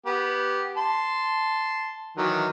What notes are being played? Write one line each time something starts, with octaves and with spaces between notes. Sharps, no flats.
B3 G4
A5 C6
D#3 E3 F#3